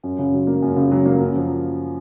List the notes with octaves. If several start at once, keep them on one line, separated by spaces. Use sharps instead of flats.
F#2
C#3
F#3
A#3
F#2
C#3
F#3
A#3
F#2
F3